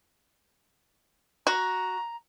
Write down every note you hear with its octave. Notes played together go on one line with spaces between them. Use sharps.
F#4 A#5